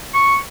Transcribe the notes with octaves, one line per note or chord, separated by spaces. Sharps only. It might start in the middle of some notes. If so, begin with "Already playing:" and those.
C#6